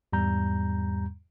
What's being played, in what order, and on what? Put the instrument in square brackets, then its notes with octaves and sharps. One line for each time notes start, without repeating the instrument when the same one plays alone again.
[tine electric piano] E2 G#2 G3 A#5 G6